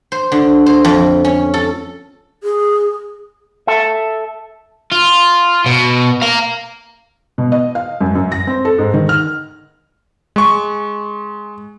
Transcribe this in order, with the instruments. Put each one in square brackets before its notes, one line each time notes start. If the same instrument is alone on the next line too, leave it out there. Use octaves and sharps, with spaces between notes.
[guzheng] C5
D3
C5
F2
C#4
A4
[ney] G#4
[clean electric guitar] A4 E5
[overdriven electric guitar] F4
B2
F5 A#5
[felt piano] B2
D#5
F5
F#2
F#2
A#6
C4
A4
G#2
D#3
F6
[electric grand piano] G#3 C#6